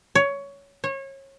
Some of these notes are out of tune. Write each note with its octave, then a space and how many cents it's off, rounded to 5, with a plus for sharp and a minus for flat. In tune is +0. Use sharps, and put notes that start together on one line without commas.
C#5 +15
C#5 -30